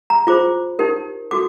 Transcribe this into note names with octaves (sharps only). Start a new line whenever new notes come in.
A#5
F4 G#4 C5 D6
D#4 G4 A#4
F#4 A4 D6